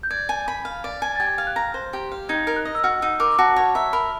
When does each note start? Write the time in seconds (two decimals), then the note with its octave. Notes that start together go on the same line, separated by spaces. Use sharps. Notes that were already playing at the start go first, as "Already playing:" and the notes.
0.03 G6
0.11 D5 G#6
0.29 G#5
0.48 B5
0.65 F5
0.84 D5
1.02 G#5
1.16 A6
1.20 G4 G#6
1.38 F5
1.47 F#6
1.56 A#5
1.74 C5
1.93 G4
2.12 F5
2.29 D#4 G#6
2.47 A#4
2.56 F#6
2.65 D#5
2.75 E6
2.84 F#4 F6
3.02 D#4 E6
3.20 A#4 D6
3.39 F#4 A5
3.56 C#5 A5
3.75 E5 A#5
3.93 A#4 B5